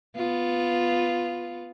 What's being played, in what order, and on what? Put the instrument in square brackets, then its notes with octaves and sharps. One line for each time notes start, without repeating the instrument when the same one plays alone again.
[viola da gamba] B3 F4